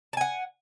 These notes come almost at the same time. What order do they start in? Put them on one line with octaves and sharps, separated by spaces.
A5 G#5 F#5